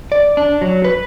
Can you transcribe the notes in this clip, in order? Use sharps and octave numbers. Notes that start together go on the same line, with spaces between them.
D5
D4
F#3
B4